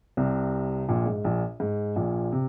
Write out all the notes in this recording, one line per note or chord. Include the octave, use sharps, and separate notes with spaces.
C2 C3
A#1 A#2
G#2
A#1 A#2
G#2
A#1 A#2
C3